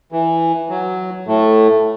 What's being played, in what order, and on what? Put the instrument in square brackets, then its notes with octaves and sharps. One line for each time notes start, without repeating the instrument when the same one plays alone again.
[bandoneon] E3
F#3
A2 A3